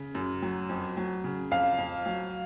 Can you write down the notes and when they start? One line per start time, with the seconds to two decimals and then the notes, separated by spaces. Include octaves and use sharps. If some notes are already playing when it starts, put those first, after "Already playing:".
Already playing: C#3
0.15 F#2
0.42 F#3
0.69 F2
0.97 F#3
1.24 C#3
1.51 F2 F5
1.78 F2
2.06 F#3